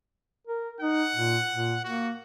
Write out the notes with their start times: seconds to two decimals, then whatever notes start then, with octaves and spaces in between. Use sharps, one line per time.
0.47 A#4
0.81 D#4 F#5
1.15 A#2
1.52 A#2
1.84 A#3 F#4